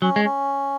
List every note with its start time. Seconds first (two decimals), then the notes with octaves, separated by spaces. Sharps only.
0.02 F#3 C#4
0.16 G#3
0.25 C#4